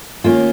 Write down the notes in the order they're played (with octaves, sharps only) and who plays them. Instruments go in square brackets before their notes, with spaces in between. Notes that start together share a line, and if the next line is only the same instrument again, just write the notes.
[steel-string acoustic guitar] D#3 A#3 C#4 F4